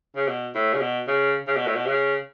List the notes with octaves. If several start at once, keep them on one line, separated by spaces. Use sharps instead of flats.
C#3
B2
A2
C#3
B2
C#3
C#3
B2
A2
B2
C#3